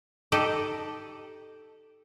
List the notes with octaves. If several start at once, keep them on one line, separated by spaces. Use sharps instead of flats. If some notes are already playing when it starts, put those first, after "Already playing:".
D#4 G4 A4 D5 D#5